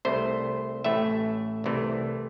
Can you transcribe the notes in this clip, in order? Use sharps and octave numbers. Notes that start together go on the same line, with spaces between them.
C2 C3 A3 C5
A1 A2 A3 E5
C2 C3 E3 A3